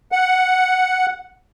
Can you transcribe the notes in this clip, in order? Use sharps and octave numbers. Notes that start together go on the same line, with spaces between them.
F#5